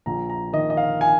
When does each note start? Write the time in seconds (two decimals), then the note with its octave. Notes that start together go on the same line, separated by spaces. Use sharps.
0.06 A#1 A#5
0.30 A#5
0.53 D#3 D#5
0.70 D#5
0.77 F5
1.01 G#5